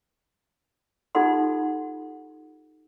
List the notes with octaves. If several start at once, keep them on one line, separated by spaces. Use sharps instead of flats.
D#4 F4 G4 A4 F#5 C6